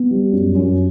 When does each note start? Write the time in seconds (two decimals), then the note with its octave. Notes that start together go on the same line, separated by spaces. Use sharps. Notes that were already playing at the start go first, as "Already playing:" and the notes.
Already playing: B3
0.11 G3
0.32 F#2
0.55 F#2